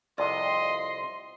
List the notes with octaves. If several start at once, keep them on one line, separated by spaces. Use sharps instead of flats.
C2 F2 C3 D5 D#5 C6